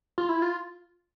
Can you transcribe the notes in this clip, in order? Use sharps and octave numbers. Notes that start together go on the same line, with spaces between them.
F4
E4
F4